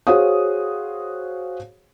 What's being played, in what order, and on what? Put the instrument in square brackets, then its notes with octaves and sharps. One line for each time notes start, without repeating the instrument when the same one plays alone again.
[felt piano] F#4 G#4 C5 C#5 F5 D#6